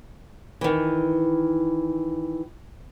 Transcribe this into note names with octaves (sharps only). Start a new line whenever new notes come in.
D#3 E3